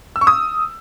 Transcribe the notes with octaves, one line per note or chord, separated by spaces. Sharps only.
E6
C#6
D#6